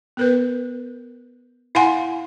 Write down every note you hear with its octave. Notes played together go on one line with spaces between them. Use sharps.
B3 A#4 B4
E4 F5 F#5 G#5 C6